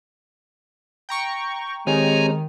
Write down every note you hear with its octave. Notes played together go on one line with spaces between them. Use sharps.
G5 A#5 C#6
D#3 G#3 C4 G4 C#5 G#5 A#5